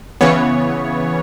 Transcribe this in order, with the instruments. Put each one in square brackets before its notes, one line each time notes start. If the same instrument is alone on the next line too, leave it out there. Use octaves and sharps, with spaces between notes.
[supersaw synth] C#3 E3 B3 C#5